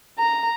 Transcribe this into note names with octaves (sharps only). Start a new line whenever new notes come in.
A#5